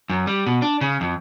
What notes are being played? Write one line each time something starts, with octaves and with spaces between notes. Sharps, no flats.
F#2
G3
B2
D4
C#3
F2